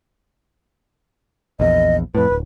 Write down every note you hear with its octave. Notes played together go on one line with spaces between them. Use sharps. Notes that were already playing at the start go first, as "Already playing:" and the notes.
A#1 E2 D#5
F2 A2 B4
D1